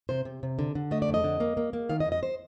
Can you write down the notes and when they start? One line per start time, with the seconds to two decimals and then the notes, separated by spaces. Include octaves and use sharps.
0.09 C3 C5
0.25 C3
0.43 C3
0.59 D3
0.75 D3
0.91 A3 D#5
1.02 D5
1.08 F2
1.14 D#5
1.24 D3
1.40 A#3
1.57 A#3
1.73 A#3
1.89 D#3 F5
2.00 D#5
2.05 F2
2.12 D#5
2.23 C5